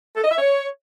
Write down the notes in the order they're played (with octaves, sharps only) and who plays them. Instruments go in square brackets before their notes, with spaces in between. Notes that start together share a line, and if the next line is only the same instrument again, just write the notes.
[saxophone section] A4
D#5
E5
C#5